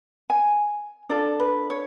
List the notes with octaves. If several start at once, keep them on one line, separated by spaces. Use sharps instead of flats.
G#5
D4 F4 A4 D5
B4
C#5